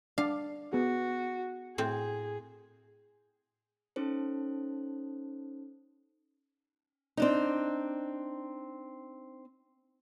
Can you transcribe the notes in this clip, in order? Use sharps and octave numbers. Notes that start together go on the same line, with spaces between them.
D4 D5 F5
B3 F#4 G#4
A2 C4 G#4
C#4 D#4 A4 C5
C4 D4 D#4